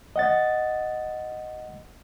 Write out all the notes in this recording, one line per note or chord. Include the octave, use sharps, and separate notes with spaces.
D#5 F#5 A6